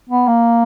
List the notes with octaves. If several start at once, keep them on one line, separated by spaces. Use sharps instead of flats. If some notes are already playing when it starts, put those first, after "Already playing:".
B3
A#3